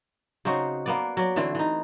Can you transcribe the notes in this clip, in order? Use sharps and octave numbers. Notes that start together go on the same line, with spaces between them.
C#3 C4 D#4 F#4
A#3 B3 D5
F#3 D5
D3 E3 A3 C4
E3 D#4